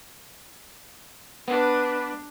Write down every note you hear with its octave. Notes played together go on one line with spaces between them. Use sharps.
B3 D4 B4